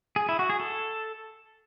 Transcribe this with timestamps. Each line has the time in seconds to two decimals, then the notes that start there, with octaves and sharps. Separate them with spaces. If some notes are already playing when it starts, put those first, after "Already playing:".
0.16 G#4
0.29 E4
0.39 F#4
0.50 G#4
0.60 A4